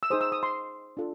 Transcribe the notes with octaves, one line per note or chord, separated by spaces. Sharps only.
E6
D#4 G#4 C5 D#6
E6
D#6
C6
D4 F4 A4